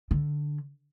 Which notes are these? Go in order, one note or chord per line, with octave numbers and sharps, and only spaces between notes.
D3